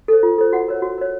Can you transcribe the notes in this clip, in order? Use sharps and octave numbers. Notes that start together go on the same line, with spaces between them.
A4 C5
F4
A4 C5
F#4 F#5
A#4 C#5
F#4
A#4 C#5